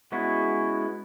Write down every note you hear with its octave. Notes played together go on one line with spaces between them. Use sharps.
G#3 B3 C#4 E4 F#4